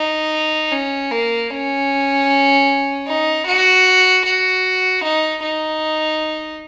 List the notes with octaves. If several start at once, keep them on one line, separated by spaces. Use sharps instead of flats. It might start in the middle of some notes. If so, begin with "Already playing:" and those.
Already playing: D#4
C#4
A#3
C#4
D#4
F#4
F#4
D#4
D#4